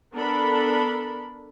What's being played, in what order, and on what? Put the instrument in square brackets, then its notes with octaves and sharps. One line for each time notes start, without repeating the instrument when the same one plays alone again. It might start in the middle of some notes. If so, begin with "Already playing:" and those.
[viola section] B3 D4 A4 A#4 B5